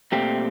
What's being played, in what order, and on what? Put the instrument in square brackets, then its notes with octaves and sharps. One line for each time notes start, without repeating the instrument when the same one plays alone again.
[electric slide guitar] A#2 A3 C4 G4